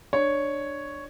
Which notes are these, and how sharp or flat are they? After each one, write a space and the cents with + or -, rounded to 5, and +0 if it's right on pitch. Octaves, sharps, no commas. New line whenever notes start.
D4 +15 C#5 +0